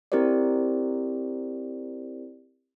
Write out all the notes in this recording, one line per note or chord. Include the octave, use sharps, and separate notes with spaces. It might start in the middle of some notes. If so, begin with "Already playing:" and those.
C4 E4 G4 A#4 C5 D5